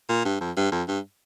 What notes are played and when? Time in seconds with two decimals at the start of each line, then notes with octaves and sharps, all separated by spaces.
0.09 A#2
0.25 G2
0.41 F2
0.57 G2
0.72 F2
0.88 G2